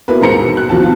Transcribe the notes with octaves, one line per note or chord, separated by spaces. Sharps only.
A#3 B3 E4 F#4 B4
D#1 G#2 A#3 C5 A#5 C#7
E1
F#6
D#2 F3 C4 F#4 A5
D#3 B3 F4